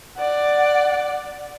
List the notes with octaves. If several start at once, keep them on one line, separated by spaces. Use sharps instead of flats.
D5 F#5